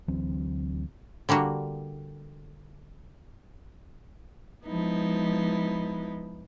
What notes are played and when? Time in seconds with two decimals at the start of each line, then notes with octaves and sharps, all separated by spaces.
0.08 D2 E3 F#3 C4
1.29 D3 G3 A#3 F#4
4.66 F3 G#3 B3 D#4 E4